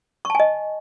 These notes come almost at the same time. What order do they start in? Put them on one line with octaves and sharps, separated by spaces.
C#6 A5 G#5 D#5